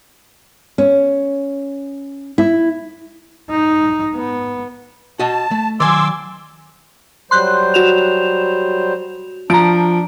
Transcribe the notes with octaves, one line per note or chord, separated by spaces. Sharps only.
C#4
E4
D#4
B3
F#4 D#5 A5
A3
D#3 F#3 D5 G#5 C6 D6 E6
F#3 G3 C5 C6 F#6 G6
F#4 E7 F7
F3 D4 A#5 D7